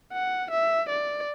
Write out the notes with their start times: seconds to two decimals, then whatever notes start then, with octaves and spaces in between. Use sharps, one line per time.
0.13 F#5
0.51 E5
0.89 D5